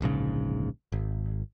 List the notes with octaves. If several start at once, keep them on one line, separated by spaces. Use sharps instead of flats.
D1 A#1 G#2 C#3
G#1